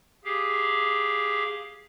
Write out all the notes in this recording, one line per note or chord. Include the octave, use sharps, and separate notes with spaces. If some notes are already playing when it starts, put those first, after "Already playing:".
G4 G#4 F5